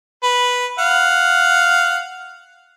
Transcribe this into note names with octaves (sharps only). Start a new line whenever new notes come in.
B4
F5 F#5